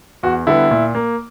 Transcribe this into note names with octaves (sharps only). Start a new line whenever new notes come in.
E2 F#4
D3 G3 B3 E4
A#2
A#3